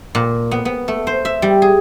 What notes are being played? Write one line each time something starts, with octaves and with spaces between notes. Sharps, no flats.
A#2
B3
B3
A3
C5
E5
G3
G#4